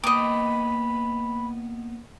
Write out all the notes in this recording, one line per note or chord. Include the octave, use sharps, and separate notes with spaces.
A#3 B3 D#5 G5 B5 D6